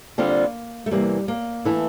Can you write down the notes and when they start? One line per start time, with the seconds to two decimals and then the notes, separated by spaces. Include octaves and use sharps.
0.18 D3 G3 A#3 C4 F4
0.86 A3
0.91 E2 C3 E3 G3 A#3
1.28 A#3
1.65 E3 A3 E4